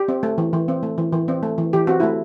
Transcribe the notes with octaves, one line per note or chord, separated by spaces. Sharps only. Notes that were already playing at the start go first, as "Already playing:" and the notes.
Already playing: G4
C4
A3
E3
E3
C4
A3
E3
E3
C4
A3
E3
E3 G4
C4 F#4
A3 E4